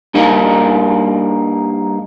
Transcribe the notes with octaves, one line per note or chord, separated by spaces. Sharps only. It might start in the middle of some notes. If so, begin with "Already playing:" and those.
G2 G3 A#3 D#4